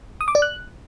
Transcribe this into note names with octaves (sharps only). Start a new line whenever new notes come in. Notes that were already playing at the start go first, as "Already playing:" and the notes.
D#6
D6
D5
F#6